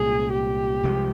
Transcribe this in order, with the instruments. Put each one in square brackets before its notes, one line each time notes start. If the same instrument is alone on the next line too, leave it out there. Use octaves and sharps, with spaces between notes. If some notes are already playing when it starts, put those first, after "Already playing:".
Already playing: [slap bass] C2 A#2 G#3 C#4 [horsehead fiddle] G#4
[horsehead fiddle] G4
[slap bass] C2 C3 F3 G#3